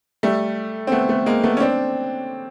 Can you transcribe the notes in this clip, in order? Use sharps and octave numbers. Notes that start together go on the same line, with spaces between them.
G3 A3
C4
A3 B3
A3 B3
G#3 A#3
A3 B3
C#4
C4 D4